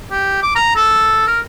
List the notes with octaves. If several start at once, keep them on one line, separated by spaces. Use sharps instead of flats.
G4
D6
A#5
A4
A#4